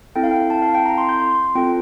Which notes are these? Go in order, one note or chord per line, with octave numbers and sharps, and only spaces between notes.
C4 E4 A4 G5
F5
G5
A5
F5
G5
A#5
C6
G6
C6
C4 F4 A4 G5